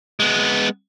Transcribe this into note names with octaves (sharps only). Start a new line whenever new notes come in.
G#3 B3